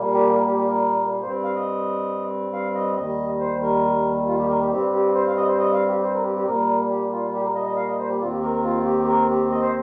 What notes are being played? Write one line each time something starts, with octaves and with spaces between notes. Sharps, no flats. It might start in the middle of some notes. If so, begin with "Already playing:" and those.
Already playing: A#2 G3 A#3
G4
A#4
G4
G4
A#4
G2 G3 C4 C5
F5
D#5
F5
D#5
D#2 D#3 G3 D#5
C5
A#4
F4
G4
A#4
G4
G2 G3 C4 G4
G4
C5
F5
D#5
C5
D#5
F5
G4
C5
A#4
G4
G4
A#2 G3 A#3 A#4
G4
F4
G4
A#4
D#5
D#5
F5
D#5
C5
G4
D#2 D#3 C4 F4
G4
A#4
A#4
F4
G4
G4
A#4
G4
D#5
C5